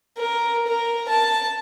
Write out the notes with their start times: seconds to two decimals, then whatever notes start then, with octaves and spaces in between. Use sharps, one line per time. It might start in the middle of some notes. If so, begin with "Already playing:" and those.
0.18 A#4
0.67 A#4
1.09 A5